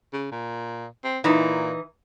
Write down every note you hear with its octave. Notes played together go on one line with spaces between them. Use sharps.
C#3
A#2
C4
A#2 E3 D#4